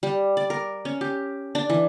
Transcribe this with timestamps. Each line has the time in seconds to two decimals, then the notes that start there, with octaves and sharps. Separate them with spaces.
0.03 G3
0.37 D5
0.50 A#4
0.85 C#4
1.01 G4
1.55 D4
1.70 E3